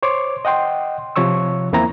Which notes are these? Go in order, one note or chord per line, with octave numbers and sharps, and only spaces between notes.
C5 C#5 C6 D6
D#5 F#5 G5 C6
C3 F3 C#5 C#6 E6
E2 A#3 C4 E4 A#5